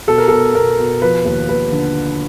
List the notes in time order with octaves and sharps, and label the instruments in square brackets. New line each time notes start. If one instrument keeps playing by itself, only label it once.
[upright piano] B2 A4
A#4
B2 A4
B2 A#4
B2
F3 B4
D#2
D#2 B4
D3